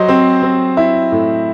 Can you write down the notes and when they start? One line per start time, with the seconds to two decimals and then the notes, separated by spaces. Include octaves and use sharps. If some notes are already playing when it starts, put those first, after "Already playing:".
Already playing: F#3 C5 D#5
0.09 C4
0.43 C4
0.77 E4
1.12 A2